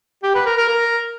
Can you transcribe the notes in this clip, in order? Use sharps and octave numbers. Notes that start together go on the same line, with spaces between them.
G4
B4
A#4
A#4
A#4